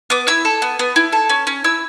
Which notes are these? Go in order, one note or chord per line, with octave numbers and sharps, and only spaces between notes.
B3 D6
E4 E6
A4
B3
B3
E4
A4
C#4
C#4
E4 E6